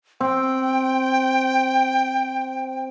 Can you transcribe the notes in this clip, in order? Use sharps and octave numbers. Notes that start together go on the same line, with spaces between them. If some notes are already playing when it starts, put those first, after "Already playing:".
C4 G5